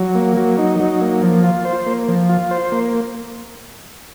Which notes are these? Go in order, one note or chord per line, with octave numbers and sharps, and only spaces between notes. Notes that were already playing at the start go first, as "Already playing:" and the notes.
Already playing: F#3
A#3
F#3
D#4
F#3
A#3
F3
F4
C5
A#3
F3
F4
C5
A#3